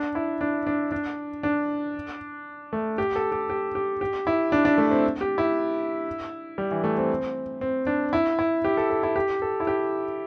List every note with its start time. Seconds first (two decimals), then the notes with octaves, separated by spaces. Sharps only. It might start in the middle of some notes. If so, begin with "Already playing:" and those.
Already playing: D4
0.15 E4
0.41 D4
0.67 D4
0.92 D4
1.43 D4
2.73 A3
2.98 G4
3.16 A4
3.32 G4
3.50 G4
3.75 G4
4.01 G4
4.27 E4
4.52 D4
4.65 D4
4.78 A3
4.91 C4
5.21 G4
5.38 E4
6.58 G3
6.71 E3
6.84 A3
6.98 C4
7.61 C4
7.87 D4
8.13 E4
8.39 E4
8.64 G4
8.77 A4
8.90 A4
9.03 E4
9.16 G4
9.42 A4
9.60 E4
9.67 G4